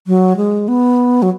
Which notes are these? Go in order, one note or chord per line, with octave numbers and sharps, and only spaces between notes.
F#3
G#3
B3
F#3